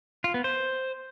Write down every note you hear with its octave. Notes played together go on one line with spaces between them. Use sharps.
F4
B3
C5